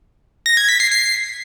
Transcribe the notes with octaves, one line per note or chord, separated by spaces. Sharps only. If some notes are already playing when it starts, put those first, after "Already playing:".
A#6
G#6
B6
C7
C7